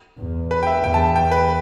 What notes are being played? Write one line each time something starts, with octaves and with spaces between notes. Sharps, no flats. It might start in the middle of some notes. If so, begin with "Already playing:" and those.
E2
B4
G5
E5
E2 G5
A5
G5
B4